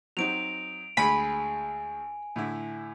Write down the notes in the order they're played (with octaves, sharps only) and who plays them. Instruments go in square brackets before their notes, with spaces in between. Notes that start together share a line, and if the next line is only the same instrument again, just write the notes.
[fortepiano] F#3 C4 D#4 [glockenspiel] D7 F7
[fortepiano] D2 G#3 G#4 [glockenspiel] G#5 [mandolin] B5
[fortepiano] A2 D3 E4